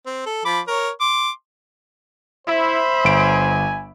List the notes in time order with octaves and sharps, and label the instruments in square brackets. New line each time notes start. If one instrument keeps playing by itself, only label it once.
[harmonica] C4
A4
F3 B5 D6
A#4 C#5
C6 D6
[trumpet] E4 [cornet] C5 [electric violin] E5 B5
[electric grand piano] G1 D7 [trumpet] G#5